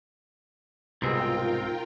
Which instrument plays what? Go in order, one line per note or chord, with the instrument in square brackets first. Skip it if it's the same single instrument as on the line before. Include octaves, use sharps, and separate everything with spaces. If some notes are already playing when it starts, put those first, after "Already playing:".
[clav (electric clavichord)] C2 B2 G#4 [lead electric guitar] G#2 C4 [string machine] F4 A#4 G5